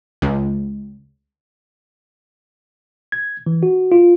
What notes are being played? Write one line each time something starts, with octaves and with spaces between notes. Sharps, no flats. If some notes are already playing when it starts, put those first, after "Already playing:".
C#2
G#6
E3
F#4
F4